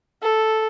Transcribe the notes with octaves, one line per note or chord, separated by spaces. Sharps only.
A4